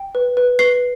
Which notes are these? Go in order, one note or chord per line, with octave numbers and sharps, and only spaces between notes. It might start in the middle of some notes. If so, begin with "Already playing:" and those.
Already playing: G5
B4
B4
B4 C7